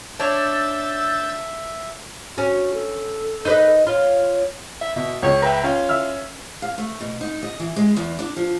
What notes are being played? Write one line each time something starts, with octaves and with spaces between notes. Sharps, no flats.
D4 C#5 E5 E6 G6 A6
C#4 F#4
A4
D#4 B4 D#5
F4 C#5
E5
B2 E5
C#2 C#5
B4 E5 G5 A#5
C#4 F4
E5 E6 F6
F5
A3
B2
D#4
D#5
E3
G#3
E2
D4
F3